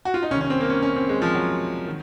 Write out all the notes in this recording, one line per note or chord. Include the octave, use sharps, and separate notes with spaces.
F#4
F4
D#4
C2 C3 D#3 C#4
C#4
C4
A#3
C#4
C#4
C4
G#3
F3
F#3
D#3